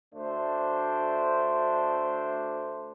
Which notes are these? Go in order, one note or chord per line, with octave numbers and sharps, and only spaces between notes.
D2 A3 D4 C5